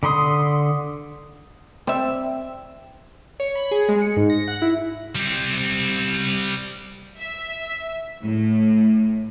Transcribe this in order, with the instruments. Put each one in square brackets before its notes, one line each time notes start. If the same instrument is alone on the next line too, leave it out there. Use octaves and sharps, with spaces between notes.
[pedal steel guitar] D3 B5 C6 D#6
[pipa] G3 E5 [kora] C4
[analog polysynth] C#5
B5
G#4
G#3
C#7
G#2
A#6
F#5
E4
[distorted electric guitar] G3 C4
[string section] E5
A2